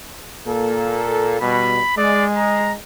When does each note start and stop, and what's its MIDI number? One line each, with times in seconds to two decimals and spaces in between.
0.46 1.39 46
0.46 1.39 58
0.46 1.39 69
1.41 1.81 47
1.41 1.81 55
1.41 1.94 83
1.97 2.75 56
1.97 2.25 74
2.37 2.72 82